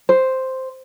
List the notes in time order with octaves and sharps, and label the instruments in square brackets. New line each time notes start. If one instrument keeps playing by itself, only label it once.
[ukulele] C5